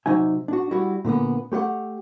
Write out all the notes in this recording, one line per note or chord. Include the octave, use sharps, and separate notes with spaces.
C3 F#3 D#4 E5 G#5
D4 F#4
G3 E4 F#4
A#2 D3 A#3 B3
A3 G4 B4 F#5